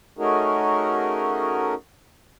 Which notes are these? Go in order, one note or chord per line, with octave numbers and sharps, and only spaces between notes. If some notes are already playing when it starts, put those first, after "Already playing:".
A3 C#4 D#4 F#4 G#4 A#4